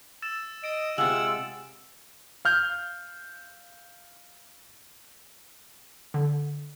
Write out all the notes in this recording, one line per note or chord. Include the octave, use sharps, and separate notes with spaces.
E6 A6 E7
D#5 D#6 D7
C3 G#3 F4 F#5 E6 F#7
F5 F6 G6
D3